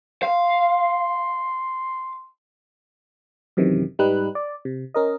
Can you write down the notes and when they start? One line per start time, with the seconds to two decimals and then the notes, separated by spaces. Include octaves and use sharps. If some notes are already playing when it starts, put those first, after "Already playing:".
0.23 F5 C6
3.57 F#2 C3 D#3 E3
3.99 G#2 G3 D#4 B4 F#6
4.35 D5
4.65 C3
4.94 C#4 A#4 D#5